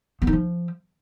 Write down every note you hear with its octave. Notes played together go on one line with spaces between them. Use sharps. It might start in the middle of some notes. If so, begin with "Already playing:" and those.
B3
D#4
F3